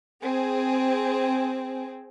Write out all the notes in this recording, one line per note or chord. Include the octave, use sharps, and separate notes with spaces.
C4 G#4